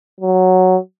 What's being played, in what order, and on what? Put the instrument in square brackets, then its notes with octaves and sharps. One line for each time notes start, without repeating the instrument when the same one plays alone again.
[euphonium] F#3